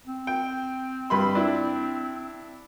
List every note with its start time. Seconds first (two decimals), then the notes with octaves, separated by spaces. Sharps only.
0.07 C4
0.27 G5
1.10 G2 B5 C6
1.35 D4 E4